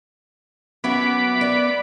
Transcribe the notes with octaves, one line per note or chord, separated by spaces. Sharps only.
F#3 B3 C#4 E5 B5 D6
D5 E5